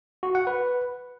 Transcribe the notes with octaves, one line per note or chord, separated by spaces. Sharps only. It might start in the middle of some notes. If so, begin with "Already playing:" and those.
F#4
F#5
B4